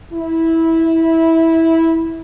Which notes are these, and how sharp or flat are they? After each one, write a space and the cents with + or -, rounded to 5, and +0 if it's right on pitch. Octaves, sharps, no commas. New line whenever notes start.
E4 -15